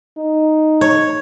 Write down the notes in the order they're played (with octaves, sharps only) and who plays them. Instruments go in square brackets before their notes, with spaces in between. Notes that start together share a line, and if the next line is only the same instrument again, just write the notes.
[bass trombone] D#4
[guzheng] C#5